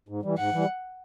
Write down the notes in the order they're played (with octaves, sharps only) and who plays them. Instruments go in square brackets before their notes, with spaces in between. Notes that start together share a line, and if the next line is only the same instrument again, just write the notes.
[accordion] G#2
E3 G3
[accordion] G#2 [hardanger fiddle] F#5
[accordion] E3 G3